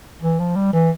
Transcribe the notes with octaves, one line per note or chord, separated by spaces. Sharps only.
E3
F3
G3
E3